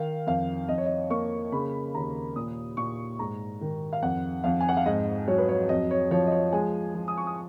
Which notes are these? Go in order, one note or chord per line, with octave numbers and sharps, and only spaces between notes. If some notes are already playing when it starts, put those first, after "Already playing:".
Already playing: D#3 F5
F2 F5
F2 D#5
C#5
D#5
A#3 C#6
C#3 B5
D#2 A#5
A#2 D#6
A#2 C#6
G#2 A#5
D#3
F5
F2 F#5
F2 F5
G#5
F#5
F5
G#2 D#5
F#3 C#5
B4
C#5
F2 D#5
C#5
F3 C#5
D#5
C#5
G#3 G#5
F3
D#6
C#6
D#6